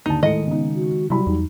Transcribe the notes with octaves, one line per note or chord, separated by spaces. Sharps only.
D#2 D3 D#4 A5
A2 D#3 G#3 A4 D#5 C#7
C#3 B3 D#4
F#4
C3 F#3 G3 E4 B5
E2 D#4